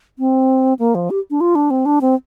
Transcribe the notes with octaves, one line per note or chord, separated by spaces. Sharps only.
C4
A#3
F3
G4
D4
F4
D4
C4
D4
C4